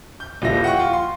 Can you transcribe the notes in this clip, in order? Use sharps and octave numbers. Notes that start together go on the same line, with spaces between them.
G6
D#1 F3 E4 A#6
F#5 G5 C#6
F4
C6